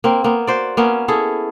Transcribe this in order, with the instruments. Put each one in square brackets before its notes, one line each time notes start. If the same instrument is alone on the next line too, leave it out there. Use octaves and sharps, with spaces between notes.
[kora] A#3 C4
A#3 B3
F#4 C5 D5
A#3 B3 C#4
C#4 E4 G#4 A4